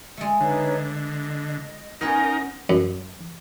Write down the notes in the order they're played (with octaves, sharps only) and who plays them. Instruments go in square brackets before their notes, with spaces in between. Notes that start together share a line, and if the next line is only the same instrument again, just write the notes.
[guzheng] G#3 A3
[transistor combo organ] D3 [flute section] D#4 B4 C#5
[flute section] D#5
[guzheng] B3 C#4 B4 [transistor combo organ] D#4 A#4
[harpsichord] F#2